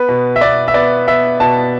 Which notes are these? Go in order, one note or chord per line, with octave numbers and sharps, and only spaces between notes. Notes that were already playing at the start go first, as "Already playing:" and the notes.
Already playing: B3 B4
B2
E5
B3 D5
E5
B3 D5
B3 E5
B2 A5